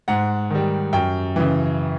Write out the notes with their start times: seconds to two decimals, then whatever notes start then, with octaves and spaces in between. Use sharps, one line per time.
0.08 G#2 F#5
0.50 D#3 G3
0.93 F#2 G5
1.36 C#3 E3